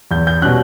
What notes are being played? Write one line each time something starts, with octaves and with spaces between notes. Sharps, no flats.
E2 G6
G6
B2 G3 C#4 F#6